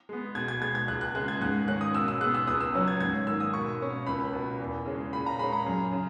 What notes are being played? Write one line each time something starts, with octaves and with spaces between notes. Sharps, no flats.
G#3 B3
B2 G#6
G#6
G#3 B3 G#6
G#6
C#2 F#6
F#6
C#3 G#3 F#6
G#6
G#2 F#6
D#3 A#3 C#4 F#6
D#6
B2 E6
E6
G#3 B3 F#6
E6
C#2 D#6
E6
C#3 F#3 C#4
G#6
G#2 G#6
D#3 A#3 E6
D#6
B2 C#6
A#3 C#4
C#2 B5
B2 A#3
E2
C#3 G#3 C#4
A#2 B5
A#5
G#3 C#4 B5
A#5
F#2
C#3